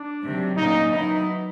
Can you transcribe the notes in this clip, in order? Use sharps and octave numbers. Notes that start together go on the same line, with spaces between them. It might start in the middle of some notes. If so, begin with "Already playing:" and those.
Already playing: D4
C3 D#3 F#3
A#2 F#3 A#3 C#4 D#4
D#3 F#3 B3 D#4 E4